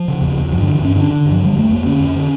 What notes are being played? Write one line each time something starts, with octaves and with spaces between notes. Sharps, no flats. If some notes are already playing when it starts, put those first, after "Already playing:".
Already playing: F3
C#3
E2
E2
G2 F3
G2 D3
E3
G2 C#4
D3 D4
D3
G2
F3
D3 G3
F2 A3
F2 A#3
D3 C#4
F2
D3